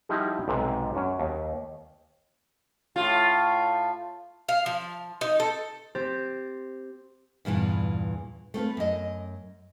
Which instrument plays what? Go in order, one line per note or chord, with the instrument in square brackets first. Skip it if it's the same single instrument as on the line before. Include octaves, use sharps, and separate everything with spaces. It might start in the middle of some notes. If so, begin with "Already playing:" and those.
[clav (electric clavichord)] F3 G3 D#4 E4 F#4 G4
B1 G#2 C3
F#2 C#4 F#4
D#2
[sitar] A2 F4
[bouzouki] F5
F3
D#4
A4
[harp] C4 G4 C5 A6
[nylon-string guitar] E2 G2 A#2 E3
A3 C4 F4 B4
F#2 D#5